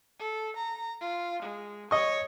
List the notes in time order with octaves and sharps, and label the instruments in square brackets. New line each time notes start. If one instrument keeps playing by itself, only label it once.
[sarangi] A4
A#5
F4
G#3
[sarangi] C#5 [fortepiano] D#5 C#6